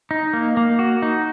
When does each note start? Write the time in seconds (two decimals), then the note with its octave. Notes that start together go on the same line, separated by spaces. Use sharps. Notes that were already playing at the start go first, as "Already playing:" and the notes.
0.11 D#4
0.33 A#3
0.57 A#3
0.79 F#4
1.02 D#4